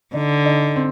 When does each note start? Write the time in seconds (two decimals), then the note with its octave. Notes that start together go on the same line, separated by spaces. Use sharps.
0.14 D3 D#4
0.45 D#4
0.76 C4